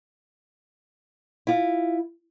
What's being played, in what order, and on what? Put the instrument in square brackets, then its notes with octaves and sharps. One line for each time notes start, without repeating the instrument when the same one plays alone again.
[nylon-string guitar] E4 F4